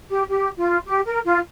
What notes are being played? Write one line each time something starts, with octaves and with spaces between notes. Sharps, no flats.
G4
G4
F4
G4
A#4
F4